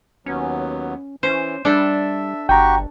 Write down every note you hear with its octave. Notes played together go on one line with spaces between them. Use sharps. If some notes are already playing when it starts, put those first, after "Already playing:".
D#2 F#3 B3 C#4
E3 C#4 C5
G3 D4 A4 E5
G1 F#4 G4 G5 A#5 C#6